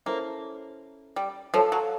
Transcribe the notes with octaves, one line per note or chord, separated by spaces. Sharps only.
A#3 C#4 E4 A4 C5
G3
F3 A4 C#5 F5
F#3